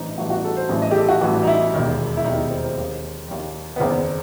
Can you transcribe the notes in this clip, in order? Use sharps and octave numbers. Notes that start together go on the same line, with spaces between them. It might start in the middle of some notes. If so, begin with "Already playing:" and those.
Already playing: A1 G2 E3 C4 D#4
A1 G2 E3 F#4
F#4
A4
C5
A1 G2 E3
D#5
G4
A4
F#4
A1 G2 E3 F#4
D#4
E4
E1 D#2 D#3
E4
E1 D#2 D#3 D#4
C4
C4
D#2 D#3
D#2 D#3
B3
F#1 E2 D#3 C4